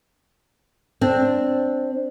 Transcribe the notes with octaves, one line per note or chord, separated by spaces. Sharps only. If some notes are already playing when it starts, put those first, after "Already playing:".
C4 D4